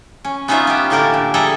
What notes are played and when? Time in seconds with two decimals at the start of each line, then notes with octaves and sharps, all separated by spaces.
0.24 C#4
0.48 B3 C#4 D#4 F4 E5
0.67 B3 G4
0.90 A2 D3 A#3 G4 A#4 A5
1.14 A#2
1.34 G3 G#4 A4 E5 A#5